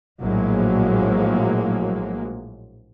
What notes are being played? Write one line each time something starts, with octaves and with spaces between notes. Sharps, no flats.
A#1 A2 F3 F#3 G#3 A#3